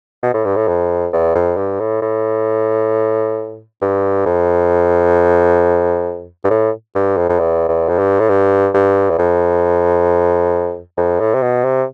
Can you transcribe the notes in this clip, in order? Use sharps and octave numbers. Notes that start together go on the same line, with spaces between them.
B2
A2
G2
A2
F2
E2
F2
G2
A2
A2
G2
F2
G2
A2
G2
F2
F2
E2
E2
F2
G2
A2
G2
G2
E2
F2
F2
A2
C3
B2
C3